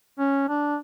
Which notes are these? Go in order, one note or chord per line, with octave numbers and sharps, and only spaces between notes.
C#4
D4